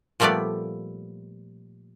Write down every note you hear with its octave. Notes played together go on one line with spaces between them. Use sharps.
A#2 F3 G3 A3 B3 D5